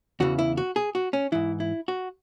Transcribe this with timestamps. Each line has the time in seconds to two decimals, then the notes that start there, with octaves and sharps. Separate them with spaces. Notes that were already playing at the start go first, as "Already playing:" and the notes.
0.20 E2 C#3 E3 F#4
0.39 E4
0.57 F#4
0.76 G#4
0.95 F#4
1.13 C#4
1.32 G#2 E3 E4
1.60 E4
1.88 F#4